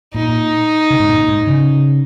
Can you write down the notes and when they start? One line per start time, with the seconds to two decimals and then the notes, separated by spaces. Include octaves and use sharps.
0.14 A#2 D#4
0.90 C3
0.99 G#2
1.09 A#2
1.28 G#2
1.47 C#3